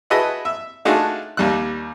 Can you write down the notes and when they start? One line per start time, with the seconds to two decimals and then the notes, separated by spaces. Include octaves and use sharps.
0.10 E4 F#4 G#4 B4 D#5 A5
0.45 E5
0.85 A3 D4 D#4 F4 F#4 G#4
1.37 D#2 G3 F#6